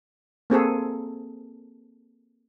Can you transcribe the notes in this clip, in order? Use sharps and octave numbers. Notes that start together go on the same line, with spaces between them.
A#3 C4 G#4 A4